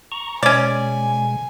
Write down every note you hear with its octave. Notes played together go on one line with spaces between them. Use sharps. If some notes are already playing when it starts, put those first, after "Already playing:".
A#5 C#6
B2 G#3 C#4 D5 G#5